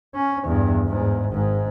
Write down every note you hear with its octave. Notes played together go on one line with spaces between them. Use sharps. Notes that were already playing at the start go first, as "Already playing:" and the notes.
C#4
E2 G2
E2 G#2
G#1 G#2